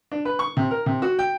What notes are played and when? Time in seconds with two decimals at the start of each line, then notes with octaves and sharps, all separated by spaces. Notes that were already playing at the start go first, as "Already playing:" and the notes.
0.12 D4
0.25 B4
0.39 C#6
0.57 C3
0.71 A#4
0.86 C3
1.02 F#4
1.19 G5